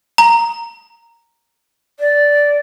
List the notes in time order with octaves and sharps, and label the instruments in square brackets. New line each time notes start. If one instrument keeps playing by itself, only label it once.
[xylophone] A#5
[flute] D5